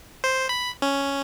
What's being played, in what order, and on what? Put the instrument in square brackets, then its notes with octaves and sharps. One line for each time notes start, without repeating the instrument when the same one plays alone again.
[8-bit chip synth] C5
B5
C#4